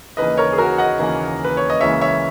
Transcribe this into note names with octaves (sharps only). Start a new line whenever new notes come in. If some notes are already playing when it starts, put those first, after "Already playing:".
D#2 C#3 E3 A#3 D#4 B4 D#5
A#4 C#5
G#4
F#4 A#4
D#5 F#5
D#2 C#3 E3 A#3 D#4
B4
C#5
D#5
C#2 C#3 E3 A#3 C#4 C#5 E5
C#5 E5